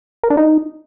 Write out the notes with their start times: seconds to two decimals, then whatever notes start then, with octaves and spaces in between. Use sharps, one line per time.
0.23 A#4
0.30 D4
0.37 D#4